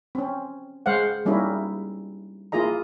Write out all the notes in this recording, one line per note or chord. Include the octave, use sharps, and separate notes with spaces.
C4 C#4
G#3 C5 F5 F#5
G3 A#3 C#4 D#4 E4
A#3 E4 F4 G#4 D#5 A#5